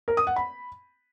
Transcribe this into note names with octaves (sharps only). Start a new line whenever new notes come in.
A#4
D#6
F#5
B5